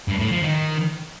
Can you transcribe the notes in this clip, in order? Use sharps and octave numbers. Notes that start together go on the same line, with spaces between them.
G2
A2
F3
D#3